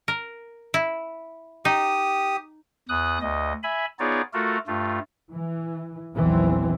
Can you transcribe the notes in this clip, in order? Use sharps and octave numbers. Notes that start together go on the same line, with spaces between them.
A#4
E4
D#4 G4 D#6
E2 D#6 F#6
D2 D#5
E5 G#5 B5
B3 D#4 F4 G#4 C#5 D5
A3 F4 F#4 A4 A#4
G2 A3 F4
E3
A#1 E2 D#3 E3 F#3 C4